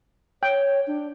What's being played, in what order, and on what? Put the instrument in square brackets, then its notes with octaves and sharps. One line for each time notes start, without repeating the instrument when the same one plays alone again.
[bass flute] C#5 [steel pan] G5
[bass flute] D4